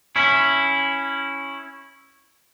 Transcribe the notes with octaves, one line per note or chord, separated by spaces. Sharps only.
C#4 E4